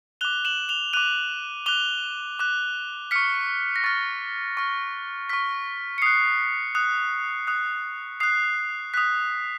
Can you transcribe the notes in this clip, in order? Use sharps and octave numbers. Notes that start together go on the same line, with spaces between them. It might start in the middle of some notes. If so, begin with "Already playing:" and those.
D6 F#6 F7 G7
E7 F#7
F7 G7
D6 F#6 D#7 F7
D6 F#6 F7 G7
D6 F#6
C#6 F6 B6 C#7
A#6
C#6 F6 A6
C#6 F6
C#6 F6 B6
C#7
D#6 F#6 C7
D#6 F#6
D#6 F#6
D#6 F#6 C7
D#6 F#6 B6